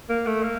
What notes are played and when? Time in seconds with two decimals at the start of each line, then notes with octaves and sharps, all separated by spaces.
0.09 A#3
0.27 A3
0.43 A#3